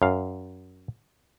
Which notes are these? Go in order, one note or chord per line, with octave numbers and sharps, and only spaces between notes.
F#2 F5